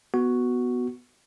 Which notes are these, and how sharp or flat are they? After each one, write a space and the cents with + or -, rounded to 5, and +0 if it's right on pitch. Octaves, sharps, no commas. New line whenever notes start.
B3 +0 F#4 +0